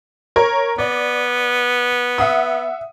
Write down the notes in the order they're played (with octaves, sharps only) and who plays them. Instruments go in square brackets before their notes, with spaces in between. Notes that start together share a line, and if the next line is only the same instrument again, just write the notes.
[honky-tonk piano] A#4 C#5
[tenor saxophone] B3 [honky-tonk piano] D5
[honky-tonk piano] E5 F#5 D#6